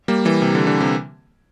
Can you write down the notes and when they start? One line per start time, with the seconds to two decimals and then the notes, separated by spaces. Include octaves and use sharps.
0.08 G3 A#3
0.25 E3 G3
0.42 C3
0.55 D3
0.67 D3
0.80 C3